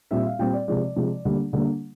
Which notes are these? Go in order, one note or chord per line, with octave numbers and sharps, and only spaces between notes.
A#2 G3 C4 E5
F5
A#2 G3 C4 G5
D5
C3 F3 G#3 D5
C3 F3 G#3
D3 G3 A#3
D3 G3 A#3